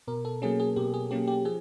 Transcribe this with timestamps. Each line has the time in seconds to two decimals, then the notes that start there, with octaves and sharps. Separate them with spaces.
0.08 B2 A#4
0.25 A4
0.42 F#3 A#3 C#4 G#4
0.60 G#4
0.76 B2 G4
0.94 G#4
1.11 F#3 A#3 C#4 G4
1.27 G4
1.45 F3 G#4